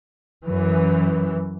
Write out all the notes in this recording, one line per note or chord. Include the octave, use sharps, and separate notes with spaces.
F#2 E3